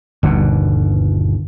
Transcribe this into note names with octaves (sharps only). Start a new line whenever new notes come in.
G1 D#2 B2